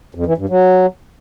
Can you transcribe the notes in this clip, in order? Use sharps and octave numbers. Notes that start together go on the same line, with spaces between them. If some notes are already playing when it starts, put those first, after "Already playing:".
F2
E3
G2
F#3